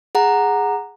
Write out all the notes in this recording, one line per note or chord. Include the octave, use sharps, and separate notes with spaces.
G#4 F#5 A#5